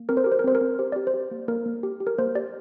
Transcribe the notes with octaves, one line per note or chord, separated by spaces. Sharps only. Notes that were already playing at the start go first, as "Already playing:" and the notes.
Already playing: A#3
C4 A#4
C5
G4 A#4
C5
A#4
C4 C5
A#4
C4
G4 C5
G4 D5
C5
G4
A#3
A#3 A#4
A#3
G4
G4
A#4
A#3 C5
G4 D5